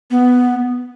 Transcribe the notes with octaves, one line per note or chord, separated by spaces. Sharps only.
B3